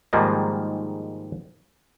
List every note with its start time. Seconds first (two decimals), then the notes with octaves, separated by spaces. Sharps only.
0.13 G#2 D#3 F3 G3 G#3 A#3